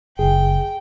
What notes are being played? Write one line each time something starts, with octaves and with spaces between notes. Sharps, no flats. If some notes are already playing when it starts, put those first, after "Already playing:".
F#1 G#4 G5